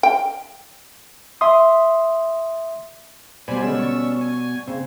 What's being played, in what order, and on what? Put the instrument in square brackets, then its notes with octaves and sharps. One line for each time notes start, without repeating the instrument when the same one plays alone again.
[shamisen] G5
[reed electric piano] E5 C6 D#6
[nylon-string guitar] B2 G3 [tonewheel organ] C5 D5 G#5 [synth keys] B5
[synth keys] D3 G#3 [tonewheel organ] C#4 E6
[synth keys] D5 C#6
[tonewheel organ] G#5
[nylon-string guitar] C#3 [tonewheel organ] C4